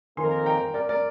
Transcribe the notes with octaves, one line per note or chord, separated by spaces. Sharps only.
F2 D#3 A#3 D#4 A#4 G#5 C6
G5 A#5
A#4 D5
A#4 D5